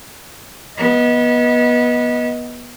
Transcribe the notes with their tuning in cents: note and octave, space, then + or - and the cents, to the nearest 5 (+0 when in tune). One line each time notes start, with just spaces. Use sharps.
B3 -25 D#5 +15